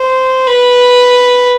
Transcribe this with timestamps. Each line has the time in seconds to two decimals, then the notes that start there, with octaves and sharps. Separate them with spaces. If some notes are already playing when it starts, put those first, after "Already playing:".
Already playing: C5
0.46 B4